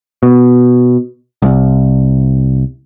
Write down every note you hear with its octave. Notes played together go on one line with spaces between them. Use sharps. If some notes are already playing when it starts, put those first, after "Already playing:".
B2
C2